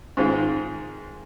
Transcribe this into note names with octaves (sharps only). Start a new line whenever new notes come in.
G#2 D#3 G#3 C4 F4